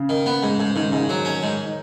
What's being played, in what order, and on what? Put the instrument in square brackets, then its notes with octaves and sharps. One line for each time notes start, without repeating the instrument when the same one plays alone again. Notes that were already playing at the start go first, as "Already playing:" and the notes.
Already playing: [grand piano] C#3
[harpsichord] D#3
B3
G#2
G#2
[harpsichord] G#2 [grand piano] D#3
[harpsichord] G#2 [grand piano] C#3
[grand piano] D#3
[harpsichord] F#3
C#4
G#2
[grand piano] D#4